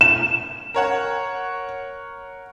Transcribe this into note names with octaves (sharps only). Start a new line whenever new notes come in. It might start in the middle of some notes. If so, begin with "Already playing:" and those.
E7
A#4 C#5 F#5